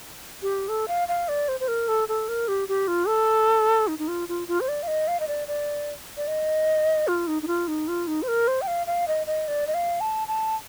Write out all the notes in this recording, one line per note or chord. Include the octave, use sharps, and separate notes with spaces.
G4
A4
F5
F5
D5
C5
C5
A#4
A4
A4
A#4
G4
G4
F4
A4
D#4
D#4
F4
F4
F4
C5
D5
F5
D#5
F5
D#5
D5
D5
D5
D#5
F4
D#4
D#4
F4
D#4
F4
D#4
C5
A#4
C5
G5
F5
F5
D#5
D#5
D5
D#5
F5
A5
A5